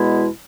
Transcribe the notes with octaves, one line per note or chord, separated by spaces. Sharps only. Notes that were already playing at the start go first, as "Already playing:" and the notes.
Already playing: E2 B2 G#3 B3 E4